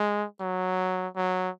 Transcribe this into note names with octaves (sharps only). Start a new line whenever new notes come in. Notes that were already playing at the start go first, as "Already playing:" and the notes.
Already playing: G#3
F#3
F#3